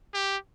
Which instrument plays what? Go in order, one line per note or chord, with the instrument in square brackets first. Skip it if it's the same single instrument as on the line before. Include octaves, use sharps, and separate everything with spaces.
[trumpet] G4